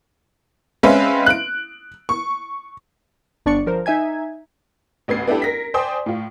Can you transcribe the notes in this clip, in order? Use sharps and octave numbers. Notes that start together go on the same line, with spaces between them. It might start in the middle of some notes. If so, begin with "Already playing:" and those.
G#3 C4 C#4 B4 E5 F5
F#6 D7
C#6
G1 D4 D5 C#6 C#7
F3 A#4 C5
D#4 E5 G#5 G#6
A1 D2 B3 G#6 C7
B3 D4 E4 G4 A4
A#4 A#6 B6
C5 D5 G5 G#5 C6 D#6
A2 F4